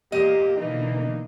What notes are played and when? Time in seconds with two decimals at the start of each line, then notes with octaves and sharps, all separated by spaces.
0.12 E2 A#2 A#3 G4 D#5
0.57 B2 D3 E3 A#3 D4 D#4